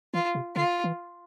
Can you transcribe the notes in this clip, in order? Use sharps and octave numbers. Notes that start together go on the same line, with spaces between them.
E3 F4
C3
D3 F4
E3